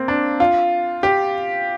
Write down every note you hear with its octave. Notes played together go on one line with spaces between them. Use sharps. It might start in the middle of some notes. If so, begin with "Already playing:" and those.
Already playing: A#3 C4
D4
F4
G4